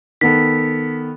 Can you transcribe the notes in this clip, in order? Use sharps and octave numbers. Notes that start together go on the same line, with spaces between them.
D#3 B3 A4 B6